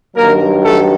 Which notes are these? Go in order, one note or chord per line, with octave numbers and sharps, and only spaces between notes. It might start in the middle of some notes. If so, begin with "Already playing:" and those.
G2 D#3 F#3 A#3 A#4
A3 A4